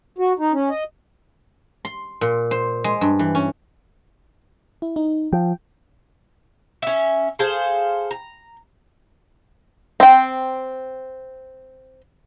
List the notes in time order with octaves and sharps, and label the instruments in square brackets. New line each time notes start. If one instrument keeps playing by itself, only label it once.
[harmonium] F#4
D#4
C#4
D#5
[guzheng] C6
A#2
C5
G#3
G2
E3
C#4
[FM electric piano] E4
D#4
[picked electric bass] F3 [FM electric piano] G5
[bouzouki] C#4 E5
G#4 A4 C5 F5
A#5
[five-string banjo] C4 G5